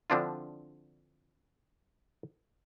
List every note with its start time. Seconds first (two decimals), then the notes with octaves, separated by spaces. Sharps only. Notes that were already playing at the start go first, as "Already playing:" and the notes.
0.10 D3 F3 C4 D4 E4 F4